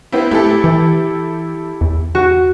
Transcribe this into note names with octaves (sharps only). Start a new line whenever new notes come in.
B3 C4 E4
A2 E4 G4 A4
E3
E2
F#4